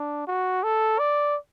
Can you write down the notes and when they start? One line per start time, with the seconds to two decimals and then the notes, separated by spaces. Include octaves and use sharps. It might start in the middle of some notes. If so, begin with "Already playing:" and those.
Already playing: D4
0.27 F#4
0.63 A4
0.99 D5